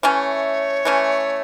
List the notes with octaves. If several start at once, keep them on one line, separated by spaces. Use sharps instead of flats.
E3 A3 C#4 C#5
E3 A3 C#4